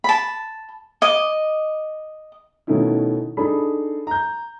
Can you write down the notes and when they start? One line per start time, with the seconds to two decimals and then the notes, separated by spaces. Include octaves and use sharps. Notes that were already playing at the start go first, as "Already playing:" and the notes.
0.04 A5 B5
1.02 D#5 D6
2.67 B2 D#3 A3 C#4 D#4 E4
3.37 D4 D#4 G#4 A4 B5
4.07 A#5 G6